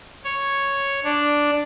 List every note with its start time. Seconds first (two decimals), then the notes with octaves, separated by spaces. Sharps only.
0.24 C#5
1.04 D4